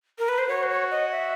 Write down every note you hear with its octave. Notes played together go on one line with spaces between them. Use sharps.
A#4
B4
C5
F#4 C#5
C5
C#5
D#5
E5